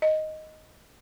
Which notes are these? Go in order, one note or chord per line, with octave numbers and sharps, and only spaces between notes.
D#5